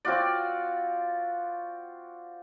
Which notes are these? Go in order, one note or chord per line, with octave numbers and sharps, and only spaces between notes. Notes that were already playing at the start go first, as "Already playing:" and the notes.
C4 F4 F#4 D5